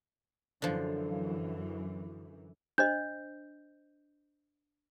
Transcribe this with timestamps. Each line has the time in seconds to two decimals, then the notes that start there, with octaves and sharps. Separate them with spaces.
0.62 F#2 D3 E3 F3
2.78 D4 C5 D#5 G6